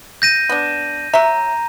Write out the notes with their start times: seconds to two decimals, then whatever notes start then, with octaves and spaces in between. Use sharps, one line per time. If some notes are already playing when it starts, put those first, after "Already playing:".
0.22 G6 A#6 D#7
0.49 B3 D4
1.13 F#3 E5 A#5